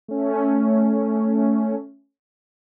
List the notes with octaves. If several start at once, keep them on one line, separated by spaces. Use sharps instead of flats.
A3 C#4